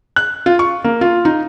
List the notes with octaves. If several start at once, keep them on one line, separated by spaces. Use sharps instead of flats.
F#6
F4
C#6
A#3
F4
D#4